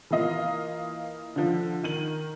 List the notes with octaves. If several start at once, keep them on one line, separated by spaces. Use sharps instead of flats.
E3 A#3 F4 D#5 F5
D3 F3
D#3 D#7 F#7